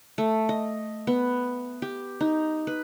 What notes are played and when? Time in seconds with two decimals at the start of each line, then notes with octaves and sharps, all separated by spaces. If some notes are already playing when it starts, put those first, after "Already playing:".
0.18 A3
0.49 D#5
1.07 B3
1.82 G4
2.21 D#4
2.67 B4